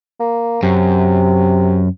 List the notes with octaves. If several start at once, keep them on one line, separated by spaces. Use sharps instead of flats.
A#3
F#2 C3